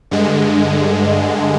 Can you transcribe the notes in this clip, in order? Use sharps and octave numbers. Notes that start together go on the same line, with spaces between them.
G2 D3 G#3